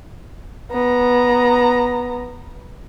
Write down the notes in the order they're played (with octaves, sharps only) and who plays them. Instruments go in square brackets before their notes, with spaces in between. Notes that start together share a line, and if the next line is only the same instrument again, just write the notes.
[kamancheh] B3 A#5